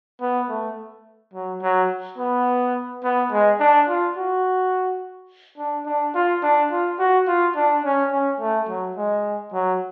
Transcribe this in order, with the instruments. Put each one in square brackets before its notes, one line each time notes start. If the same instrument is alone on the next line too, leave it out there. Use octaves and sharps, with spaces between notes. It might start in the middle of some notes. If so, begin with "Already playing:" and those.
[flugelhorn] B3
A3
F#3
F#3
B3
B3
G#3
D4
F4
F#4
D4
D4
F4
D4
F4
F#4
F4
D4
C#4
C#4
A3
F#3
G#3
F#3